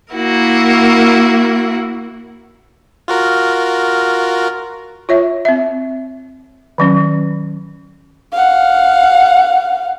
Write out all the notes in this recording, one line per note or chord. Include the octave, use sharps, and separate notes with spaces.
A#3 E4 F#4 A#4
F4 F#4 A#4
F4 C#5 E5
C4 E5
D#3 F#3 C#4
F5 F#5